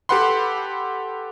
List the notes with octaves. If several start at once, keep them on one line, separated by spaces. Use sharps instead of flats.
G4 A4 B4 F#5 B5 C6